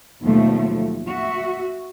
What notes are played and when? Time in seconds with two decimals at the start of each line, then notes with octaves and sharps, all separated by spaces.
0.22 D#2 B2 F3 F#3 A3
1.08 F#4 E5